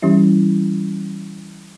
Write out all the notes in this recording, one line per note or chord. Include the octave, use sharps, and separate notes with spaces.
E3 G3 C#4 E4